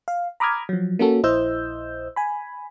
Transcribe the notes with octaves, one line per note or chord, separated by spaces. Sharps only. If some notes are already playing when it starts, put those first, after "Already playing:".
F5
A#5 B5 D6 D#6 F6 G#6
F3 F#3
A#3 C#4 F#4 A4
A#1 E4 C5 D#5 E6 G6
G#5 B5